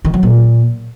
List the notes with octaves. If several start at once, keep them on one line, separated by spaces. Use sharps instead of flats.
D#3
F#3
A#2